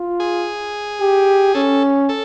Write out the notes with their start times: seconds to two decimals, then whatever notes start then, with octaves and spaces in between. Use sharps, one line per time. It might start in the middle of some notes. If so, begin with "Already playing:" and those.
Already playing: F4
0.20 G#4
1.01 G4
1.55 C#4 A4
2.09 A4